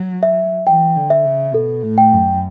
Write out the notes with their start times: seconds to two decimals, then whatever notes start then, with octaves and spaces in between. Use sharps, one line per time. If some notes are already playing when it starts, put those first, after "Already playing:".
Already playing: F#3
0.23 E5
0.67 E3 G5
0.96 D3
1.10 E5
1.25 C#3
1.54 B2 A4
1.83 A2
1.98 G5
2.12 F#2